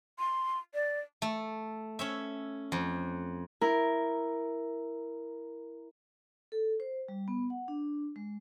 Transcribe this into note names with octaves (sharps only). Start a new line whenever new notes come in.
C6
D5
A3
C#4 C#5 E5
F2
E4 A#4
A4
C5
G3
B3
F#5
D4
G#3